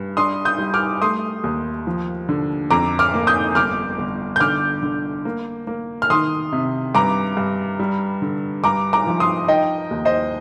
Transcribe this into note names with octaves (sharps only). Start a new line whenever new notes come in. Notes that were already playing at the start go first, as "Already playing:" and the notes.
Already playing: G2
D4 C6 D#6
D#6 G6
G3
D6 F6
A3 C6 D#6
D#2
F3
D3
F2 A#5 D6
D6 F6
A#3
D#6 G6
G1 D6 F6
G1
G6
D3 D6 F6
D3
A#3
A#3
F6
D#3 C6 D#6
C3
G2 A#5 D6
G2
G3
D3
G2 A#5 D6
A#5 D6
F3
C6 D#6
D#4 D#5 G5
D#2
C5 D#5